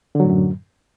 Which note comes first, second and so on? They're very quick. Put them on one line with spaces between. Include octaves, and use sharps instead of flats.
D3 F#3 A2 F#2